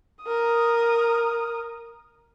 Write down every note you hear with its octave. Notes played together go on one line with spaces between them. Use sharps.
A#4 D#6